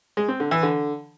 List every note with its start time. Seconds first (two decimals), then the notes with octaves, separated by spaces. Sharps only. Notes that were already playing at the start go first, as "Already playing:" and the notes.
0.17 G#3
0.28 C4
0.40 D3
0.51 E3
0.63 D3